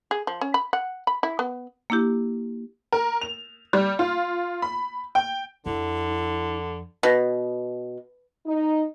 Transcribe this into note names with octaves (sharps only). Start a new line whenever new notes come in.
G#4
F3
C#4
B5
F#5
B5
E4
B3
A#3 D4 E4 G4
A#4
F7
G3
F4
B5
G5
F2 D3 E4
B2
D#4